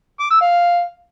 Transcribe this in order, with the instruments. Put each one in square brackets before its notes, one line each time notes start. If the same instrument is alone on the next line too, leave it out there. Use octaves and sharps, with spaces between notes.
[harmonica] D6
E6
F5